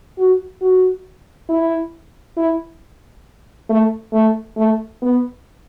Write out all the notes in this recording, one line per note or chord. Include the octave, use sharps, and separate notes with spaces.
F#4
F#4
E4
E4
A3
A3
A3
B3